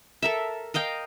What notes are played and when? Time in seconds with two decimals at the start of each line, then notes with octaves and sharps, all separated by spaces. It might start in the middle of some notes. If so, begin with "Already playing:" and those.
0.22 A4 A#4 E5
0.74 A#4 D#5 F5 G5